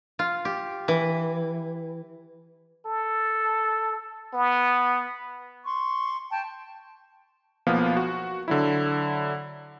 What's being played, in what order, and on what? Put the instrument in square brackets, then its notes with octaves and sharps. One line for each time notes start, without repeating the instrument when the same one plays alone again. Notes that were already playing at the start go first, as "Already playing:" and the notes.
[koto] F4
G4
E3
[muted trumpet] A4
B3
[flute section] C6 C#6
G5 A5
[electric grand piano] B1 F3 A#3 B3 F5
F#4
D3 F#3 E4